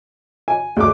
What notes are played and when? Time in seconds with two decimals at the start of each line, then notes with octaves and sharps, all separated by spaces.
0.48 G#5
0.77 D2 G#4 D6